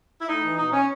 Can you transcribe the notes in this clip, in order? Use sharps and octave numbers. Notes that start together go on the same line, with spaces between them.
E4
A2 D#4
E3
B2 D#4
C#4